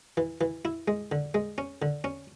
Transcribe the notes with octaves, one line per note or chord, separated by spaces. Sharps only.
E3
E3
E4
G#3
D3
G#3
C#4
D3
C#4